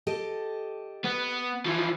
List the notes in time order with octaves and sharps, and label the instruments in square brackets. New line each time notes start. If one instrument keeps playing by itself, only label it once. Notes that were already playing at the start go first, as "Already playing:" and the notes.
[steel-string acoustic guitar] G4 A4 D#5
[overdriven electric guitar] B3
E3 F3